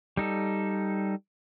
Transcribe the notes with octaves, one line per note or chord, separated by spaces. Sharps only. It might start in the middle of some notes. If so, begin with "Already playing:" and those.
G3 D#4 A4